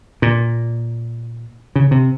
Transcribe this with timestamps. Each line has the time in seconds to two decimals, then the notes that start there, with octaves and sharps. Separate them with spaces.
0.22 A#2
1.76 C#3
1.91 C3